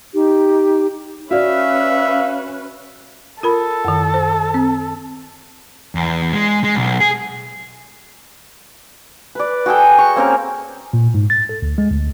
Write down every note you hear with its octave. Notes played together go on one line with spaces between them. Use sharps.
D#4 G4
C#4 F#4 B4 D5 E5 F5
F4 A4 A#4 B5
F#2 D#3
C5
C4
E2
G#3
G#3
B1
G#4
B4 D5
F#4 G#4 A4 G5
C#6
A#3 C4 C#4 A#4
A#2
G#2
A6
A4
D2
G#3
D2